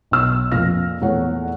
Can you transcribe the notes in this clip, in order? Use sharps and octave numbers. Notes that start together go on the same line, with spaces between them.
B1 E6
F2 A#2 F3 F6 A#6
E2 A#2 A3 C#5 F#5